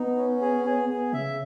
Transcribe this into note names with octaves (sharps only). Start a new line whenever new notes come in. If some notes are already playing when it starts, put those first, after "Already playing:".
Already playing: B3 D#4
C#4
G#4
G#4
B3 G#4
C#3 E5